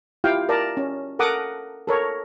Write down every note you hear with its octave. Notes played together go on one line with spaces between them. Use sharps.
E4 F4 G4 F5 G5
A#4 D5 A5 A#5
C#4
A4 A#4 F#5 D6 D#6
A4 A#4 C#5